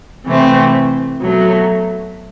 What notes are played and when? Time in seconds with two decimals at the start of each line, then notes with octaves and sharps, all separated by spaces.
0.25 C3 E3 A3 C4
1.19 B2 F#3 A3